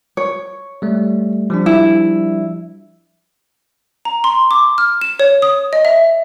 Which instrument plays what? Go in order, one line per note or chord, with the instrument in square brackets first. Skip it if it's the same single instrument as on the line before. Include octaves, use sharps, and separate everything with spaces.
[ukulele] C#5
[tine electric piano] G3 A3
F3 G3 D4
[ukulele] E4
[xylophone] A#5
C6
D6
F6
E7
C#5
D#6
D#5
E5